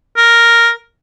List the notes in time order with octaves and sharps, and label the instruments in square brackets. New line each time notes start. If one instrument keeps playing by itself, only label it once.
[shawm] A#4